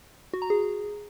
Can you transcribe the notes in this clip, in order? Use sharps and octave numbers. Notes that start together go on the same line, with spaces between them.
F#4
A#5
G#4